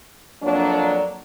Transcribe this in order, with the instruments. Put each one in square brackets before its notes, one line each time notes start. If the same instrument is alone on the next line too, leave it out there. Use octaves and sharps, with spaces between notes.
[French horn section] F2 F#3 A#3 D4